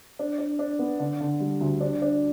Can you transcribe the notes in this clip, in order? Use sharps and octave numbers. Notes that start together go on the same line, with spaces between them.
D4
D4
D4
B3
D3
D3
G3
D2
D4
D4